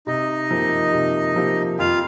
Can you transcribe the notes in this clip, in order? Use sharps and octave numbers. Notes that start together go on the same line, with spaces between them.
C3 D#4 D#5
F3 A#3 G4
C3
F3 A#3 G4
F2 F4 F5